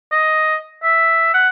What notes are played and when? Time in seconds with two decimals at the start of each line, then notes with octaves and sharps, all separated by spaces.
0.12 D#5
0.84 E5
1.34 F#5